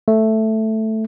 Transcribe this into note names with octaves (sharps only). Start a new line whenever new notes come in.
A3